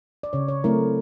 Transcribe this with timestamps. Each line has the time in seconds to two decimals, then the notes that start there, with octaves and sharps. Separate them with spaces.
0.23 D5
0.33 C#3 C#5
0.48 C#5
0.64 F#3 A3 C4 E4 A#4